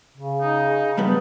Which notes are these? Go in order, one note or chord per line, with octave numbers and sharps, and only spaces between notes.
C#3
D#4
G2 G3 B3